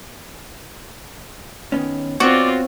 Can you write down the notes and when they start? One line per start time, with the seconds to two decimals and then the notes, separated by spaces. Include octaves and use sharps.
1.72 D#3 B3 C#4
2.20 B3 C4 F4 F#4 C#5 D5